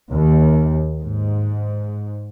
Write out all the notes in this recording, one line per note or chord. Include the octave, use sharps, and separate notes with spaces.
D#2
G#2